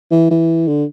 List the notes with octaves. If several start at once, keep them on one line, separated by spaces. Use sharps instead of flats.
E3
E3
D3